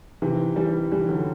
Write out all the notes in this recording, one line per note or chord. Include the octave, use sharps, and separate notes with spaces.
C3 E3
E3 G3
E3 G3
D3 F#3